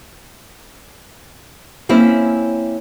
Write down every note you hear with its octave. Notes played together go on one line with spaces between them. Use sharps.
A#3 C4 C#4 E4